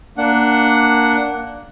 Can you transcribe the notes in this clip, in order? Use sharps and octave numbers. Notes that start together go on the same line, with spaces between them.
A#3 D4 F#5